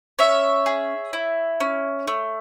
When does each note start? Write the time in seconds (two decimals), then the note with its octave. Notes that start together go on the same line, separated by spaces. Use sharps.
0.19 C#4 C#5 E5
0.66 G#4
1.13 E4
1.60 C#4
2.07 A3